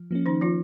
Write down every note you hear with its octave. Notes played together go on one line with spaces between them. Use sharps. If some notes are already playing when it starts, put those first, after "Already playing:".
Already playing: F3
F3 A#3 C#4
D#3 D#4
F3 F4